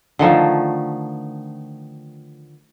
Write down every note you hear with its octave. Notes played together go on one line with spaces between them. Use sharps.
D3 D#3 F3 A3